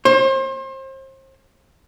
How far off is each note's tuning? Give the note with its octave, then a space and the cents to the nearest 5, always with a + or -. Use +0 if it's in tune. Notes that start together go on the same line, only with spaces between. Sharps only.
C5 +35